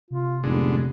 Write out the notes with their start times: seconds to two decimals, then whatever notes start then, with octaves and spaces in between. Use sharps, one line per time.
0.11 C3 F4
0.44 F1 G#2 D3 B3